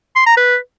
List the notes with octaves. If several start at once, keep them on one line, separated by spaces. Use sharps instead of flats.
C6
A#5
B4